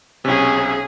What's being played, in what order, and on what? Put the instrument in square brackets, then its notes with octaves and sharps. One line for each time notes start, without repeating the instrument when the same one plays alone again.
[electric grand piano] B1 C3 [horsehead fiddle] C#4 G#4